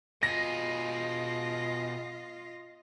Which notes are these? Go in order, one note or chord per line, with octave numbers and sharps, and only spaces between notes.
B2 F4 G#4 D#5 A#6